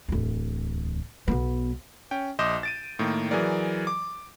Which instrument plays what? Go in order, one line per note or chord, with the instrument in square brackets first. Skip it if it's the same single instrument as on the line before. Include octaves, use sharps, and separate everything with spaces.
[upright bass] D1 E2
B1 B3
[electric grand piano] C#4 G5
A#1 D#5 C6 D6 G6 E7
A6 D7 D#7
A2 D#3 A#3
E3 F#3 G#4 A#4 D5
D6